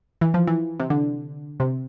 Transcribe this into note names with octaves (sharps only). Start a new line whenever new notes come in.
E3
F3
E3
C3
D3
C3